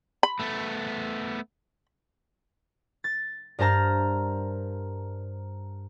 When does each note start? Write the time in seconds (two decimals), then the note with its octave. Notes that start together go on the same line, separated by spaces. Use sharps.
0.23 B5
0.39 A3 B3
3.04 A6
3.59 G2 A#4 C5 A5 A#5 F6